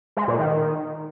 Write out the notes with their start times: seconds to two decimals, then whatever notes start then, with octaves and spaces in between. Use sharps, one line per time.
0.17 G#3
0.28 A#2
0.39 D#3